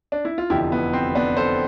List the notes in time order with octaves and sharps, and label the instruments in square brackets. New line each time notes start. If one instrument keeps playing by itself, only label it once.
[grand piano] D4
E4
F4
F1 E2 D3 F3 E4 G4
B3
C4
B3 D4
A4 C5